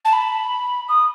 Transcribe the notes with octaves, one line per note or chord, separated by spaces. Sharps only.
A5
B5
D#6